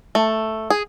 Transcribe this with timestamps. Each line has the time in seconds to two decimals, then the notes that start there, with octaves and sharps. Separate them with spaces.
0.15 A3
0.70 G#4